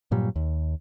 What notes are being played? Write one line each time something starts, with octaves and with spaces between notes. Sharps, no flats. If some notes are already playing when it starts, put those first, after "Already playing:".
G2 A#2 F#3 G3
D#2